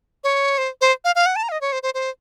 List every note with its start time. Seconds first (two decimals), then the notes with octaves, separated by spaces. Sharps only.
0.24 C#5
0.58 C5
0.81 C5
1.04 F5
1.15 F5
1.26 F#5
1.36 A5
1.43 A#5
1.49 F5
1.52 D#5
1.61 C#5
1.72 C5
1.83 C5
1.94 C5